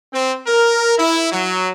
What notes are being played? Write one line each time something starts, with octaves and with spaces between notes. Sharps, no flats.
C4
A#4
E4
F#3